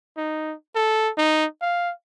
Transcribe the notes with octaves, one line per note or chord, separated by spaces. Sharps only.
D#4
A4
D#4
F5